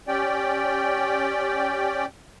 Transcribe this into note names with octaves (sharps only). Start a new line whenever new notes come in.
C#4 G4 D5 G5